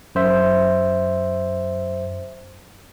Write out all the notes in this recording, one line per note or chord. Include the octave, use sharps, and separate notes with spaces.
F#2 C5 E5